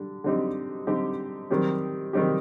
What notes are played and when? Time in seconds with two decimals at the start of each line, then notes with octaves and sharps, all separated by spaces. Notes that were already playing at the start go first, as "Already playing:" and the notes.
Already playing: D3 G3
0.24 D3 G3 C4 D#4 G4
0.87 D3 G3 C4 D#4 G4
1.50 D#3 G3 C4 D#4 G4
2.13 D#3 G3 C4 D#4 G4